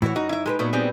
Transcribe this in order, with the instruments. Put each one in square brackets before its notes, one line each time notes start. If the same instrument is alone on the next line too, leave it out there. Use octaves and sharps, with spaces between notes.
[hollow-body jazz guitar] A2 E3 [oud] E4 F#4 C#5
[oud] F#2 [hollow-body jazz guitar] D#4 [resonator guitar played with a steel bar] F#4
[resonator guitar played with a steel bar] E4 E5
[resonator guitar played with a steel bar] G#3 [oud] G4 A4 B4
[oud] A#2 F#3 B3 [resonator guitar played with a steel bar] A3
[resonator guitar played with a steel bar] G3 C4 G#4